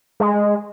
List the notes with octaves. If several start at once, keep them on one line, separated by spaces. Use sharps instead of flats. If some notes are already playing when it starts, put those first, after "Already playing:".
G#3